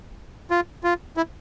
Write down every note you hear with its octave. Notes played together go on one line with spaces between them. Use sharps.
F4
F4
E4